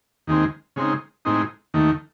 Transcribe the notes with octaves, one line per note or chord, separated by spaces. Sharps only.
D#2 D#3 G#3 C4
C#3 G#3 C4 D#4
A2 G#3 C4 D#4
D#2 D#3 A3